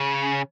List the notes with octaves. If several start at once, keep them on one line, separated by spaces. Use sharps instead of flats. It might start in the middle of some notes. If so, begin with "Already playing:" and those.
Already playing: C#3